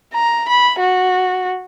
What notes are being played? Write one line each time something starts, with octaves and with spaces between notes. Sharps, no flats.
A#5
B5
F#4